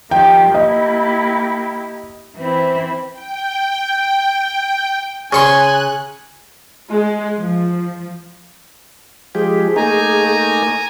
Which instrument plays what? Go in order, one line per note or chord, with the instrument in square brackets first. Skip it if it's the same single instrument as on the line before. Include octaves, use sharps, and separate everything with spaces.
[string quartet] D#3 F3 G4 [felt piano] G5
[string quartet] A#3 E4 G4 [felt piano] D#5
[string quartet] E3 C4 E4
[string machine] G5
[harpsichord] C#3 C#5 C6 [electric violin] G#5 [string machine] F#6
[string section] G#3
F3
[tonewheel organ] F3 G#3 G4 [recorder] G#4
[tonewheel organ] A3 A#3 D#4 [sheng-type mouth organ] G#5 A#5